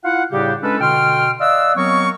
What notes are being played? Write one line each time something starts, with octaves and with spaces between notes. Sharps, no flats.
E4 F4 F5 F#5
A2 C#3 G3 D4 G4
G#3 C#4 D4 A4 B4
B2 D3 G5 C6 F6
D5 D#5 F5 F#5 E6
F#3 B3 C4 A#4 C#5 C#6